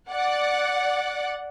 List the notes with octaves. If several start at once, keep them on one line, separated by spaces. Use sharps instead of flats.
D5 F#5